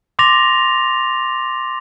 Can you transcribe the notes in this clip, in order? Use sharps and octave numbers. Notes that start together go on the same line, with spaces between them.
C6 D6 A6 A#6 F7